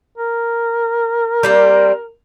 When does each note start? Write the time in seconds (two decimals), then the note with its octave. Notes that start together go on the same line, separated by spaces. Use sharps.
0.18 A#4
1.43 G3 A#3 C4